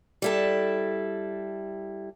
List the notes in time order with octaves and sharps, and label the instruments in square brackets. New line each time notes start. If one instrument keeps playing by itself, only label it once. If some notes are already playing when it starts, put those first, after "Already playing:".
[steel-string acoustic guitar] G3 E4 A4